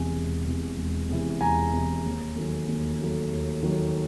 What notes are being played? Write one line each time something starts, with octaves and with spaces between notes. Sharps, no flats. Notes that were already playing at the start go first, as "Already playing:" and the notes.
Already playing: E1 E2 C3 E3 G#5
E1
E2 C3 E3
E1
E2 C3 E3
E1 G#5 A#5
E2 C3 E3
D#2
D#3 F#3 A3
D#2
D#3 F#3 A3
D#2
D#3 F#3 A3